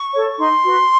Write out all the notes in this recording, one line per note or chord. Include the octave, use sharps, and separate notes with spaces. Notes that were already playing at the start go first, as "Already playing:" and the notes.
Already playing: C#6
A4 C#5
D#4 C6
F#4 B4